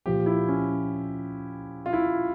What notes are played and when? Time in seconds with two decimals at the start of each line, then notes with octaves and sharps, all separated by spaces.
0.06 A#2 F3 G4
0.26 E4
0.48 C#4
1.86 F4
1.93 E4